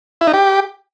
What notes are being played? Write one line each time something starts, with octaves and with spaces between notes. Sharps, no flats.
E4
D#4
G4